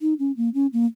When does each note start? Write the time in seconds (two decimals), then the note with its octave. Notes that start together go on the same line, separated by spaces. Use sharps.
0.01 D#4
0.19 C#4
0.37 A#3
0.54 C#4
0.73 A#3